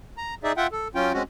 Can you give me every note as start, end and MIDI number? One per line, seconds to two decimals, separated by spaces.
0.18 0.35 82
0.44 0.52 63
0.44 0.52 68
0.44 0.52 74
0.44 0.52 76
0.57 0.67 65
0.57 0.67 76
0.57 0.67 78
0.57 0.67 79
0.72 0.88 69
0.95 1.13 54
0.95 1.13 61
0.95 1.13 65
0.95 1.13 79
1.14 1.23 56
1.14 1.23 60
1.14 1.23 61
1.14 1.23 66